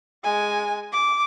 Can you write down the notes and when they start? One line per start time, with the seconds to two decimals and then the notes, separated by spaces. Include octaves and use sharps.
0.24 G#3 G#5
0.92 D6